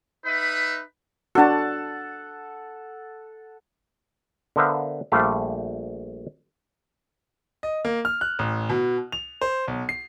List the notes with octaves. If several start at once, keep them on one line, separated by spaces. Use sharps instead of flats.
D#4 B4 E5 B5
D4 F#4 A4 F#5 A5
D3 B3 A#4 C5 E5 F5
A#1 G3 A3 C5 D5 F5
D#5
A#3
F6
F#6
A1
B2
F7
C5
B1
C7